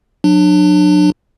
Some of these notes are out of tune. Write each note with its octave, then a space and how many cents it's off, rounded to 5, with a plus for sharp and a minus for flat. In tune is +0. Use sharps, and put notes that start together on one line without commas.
F#3 -25 D4 +25